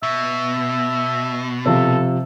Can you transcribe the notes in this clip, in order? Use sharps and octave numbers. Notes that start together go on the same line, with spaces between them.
B2 E5
C3 F3 A4